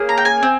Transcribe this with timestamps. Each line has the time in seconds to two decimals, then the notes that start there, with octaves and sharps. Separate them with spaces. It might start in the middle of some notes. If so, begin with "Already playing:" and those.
Already playing: A#3 C#4 G#4
0.09 A#5
0.18 G5
0.25 G#5
0.43 C4